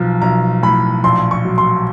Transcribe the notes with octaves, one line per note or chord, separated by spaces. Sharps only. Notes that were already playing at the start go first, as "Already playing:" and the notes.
Already playing: B1 F3
B1 A#5
A2 B5
A#1 C6
C#6
F#3
C6